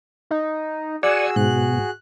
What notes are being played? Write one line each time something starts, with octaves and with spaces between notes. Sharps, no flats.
D#4
F#4 G#4 D5 F#5 G#5 E6
G#2 B2 F#6